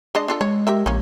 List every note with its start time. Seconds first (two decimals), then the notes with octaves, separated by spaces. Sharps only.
0.15 G#3 D4 D#5
0.28 D4 F4 A4
0.41 G#3 C#5
0.67 G4 A#4 E5
0.86 A#1 A#3 C#4